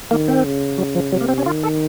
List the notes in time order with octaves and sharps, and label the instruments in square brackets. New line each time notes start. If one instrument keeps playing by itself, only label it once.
[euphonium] D#3 [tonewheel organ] A#3
[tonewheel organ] C4
[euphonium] C#3
[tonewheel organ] F#3
F3
[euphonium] C3 [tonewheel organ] F#3
[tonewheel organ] A#3
C4
C#4
[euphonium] D#3 [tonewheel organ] F4
[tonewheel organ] A4